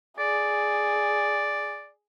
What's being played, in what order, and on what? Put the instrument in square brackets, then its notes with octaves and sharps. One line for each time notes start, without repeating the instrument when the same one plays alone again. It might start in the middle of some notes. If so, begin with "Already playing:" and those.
[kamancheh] G#4 [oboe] D5